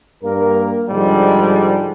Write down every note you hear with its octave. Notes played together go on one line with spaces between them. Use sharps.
G2 A#3 A#4
G#2 D3 F3 G3 G#3